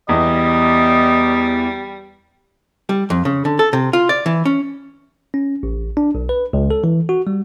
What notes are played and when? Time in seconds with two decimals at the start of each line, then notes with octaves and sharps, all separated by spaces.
0.09 E2 G3 D#5
2.89 G3
3.10 F2
3.25 C#3
3.45 D3
3.59 A4
3.73 C3
3.93 F4
4.09 D5
4.26 E3
4.45 C#4
5.34 C#4
5.63 A1
5.97 D4
6.15 B1
6.29 B4
6.53 C#2
6.71 A4
6.84 E3
7.09 F#4
7.27 G3